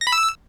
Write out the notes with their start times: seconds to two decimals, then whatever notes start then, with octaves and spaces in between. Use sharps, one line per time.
0.01 A#6
0.07 B5
0.12 E6